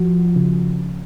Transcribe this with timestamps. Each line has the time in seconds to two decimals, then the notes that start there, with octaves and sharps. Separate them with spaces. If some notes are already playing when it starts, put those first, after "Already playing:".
Already playing: F3 F#4
0.36 C#3